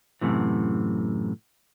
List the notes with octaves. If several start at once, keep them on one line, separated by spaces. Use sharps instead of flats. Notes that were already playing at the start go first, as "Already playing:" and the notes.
F#2 A2 C3 E3